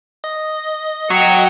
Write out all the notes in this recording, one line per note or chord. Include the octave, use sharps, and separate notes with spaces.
D#5
F#3 G5 C#6